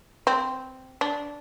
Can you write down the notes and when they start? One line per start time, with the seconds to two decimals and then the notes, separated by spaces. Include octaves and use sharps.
0.27 C4
1.01 D4